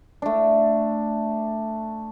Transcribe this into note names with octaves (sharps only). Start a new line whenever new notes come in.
A3 D4